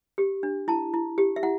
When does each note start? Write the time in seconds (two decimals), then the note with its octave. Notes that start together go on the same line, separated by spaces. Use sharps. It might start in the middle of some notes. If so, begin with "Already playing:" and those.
0.18 G4
0.43 D4
0.68 E4 A5
0.94 E4
1.18 G4
1.36 E5
1.43 E4 F#5